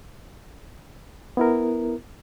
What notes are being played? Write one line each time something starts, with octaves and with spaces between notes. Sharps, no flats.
B3 E4 A#4